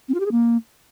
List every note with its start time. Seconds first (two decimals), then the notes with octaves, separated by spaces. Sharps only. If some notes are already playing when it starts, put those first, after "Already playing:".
0.09 C4
0.14 F4
0.20 G4
0.26 G#4
0.31 A#3